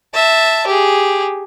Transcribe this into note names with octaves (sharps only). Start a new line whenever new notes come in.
E5 A5
G4 G#4